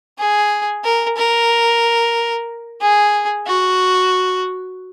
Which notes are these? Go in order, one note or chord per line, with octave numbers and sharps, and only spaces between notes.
G#4
A#4
A#4
G#4
F#4